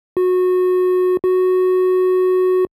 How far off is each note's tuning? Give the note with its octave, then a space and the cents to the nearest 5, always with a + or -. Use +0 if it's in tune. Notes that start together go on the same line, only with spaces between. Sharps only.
F#4 -20
F#4 -5